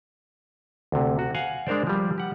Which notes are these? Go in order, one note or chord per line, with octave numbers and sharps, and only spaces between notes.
D2 C3
F#4
F5 F#5 G#5
G#3 D4 A#4 C5 D5
F3 G3
G4 F#5